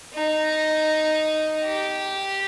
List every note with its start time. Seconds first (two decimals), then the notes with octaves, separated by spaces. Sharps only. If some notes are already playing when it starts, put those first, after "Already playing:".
0.14 D#4
1.65 G4